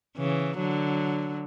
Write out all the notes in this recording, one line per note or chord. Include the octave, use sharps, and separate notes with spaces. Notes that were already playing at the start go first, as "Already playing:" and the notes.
C#3 E3
D3 F#3